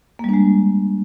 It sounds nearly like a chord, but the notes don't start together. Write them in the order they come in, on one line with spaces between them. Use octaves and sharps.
A#3 G3 D4 G#3